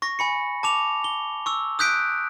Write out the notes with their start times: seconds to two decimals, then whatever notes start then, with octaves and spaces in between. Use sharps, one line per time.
0.02 C#6 A#6
0.19 G#5 B5 C#7
0.63 A5 D6 F7
1.04 G7
1.46 C#6 E6
1.79 D#6 F#6 G6 B6 D7